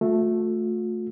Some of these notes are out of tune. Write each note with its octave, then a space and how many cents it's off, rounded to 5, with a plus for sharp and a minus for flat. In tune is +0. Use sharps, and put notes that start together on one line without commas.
A3 +0 F4 +45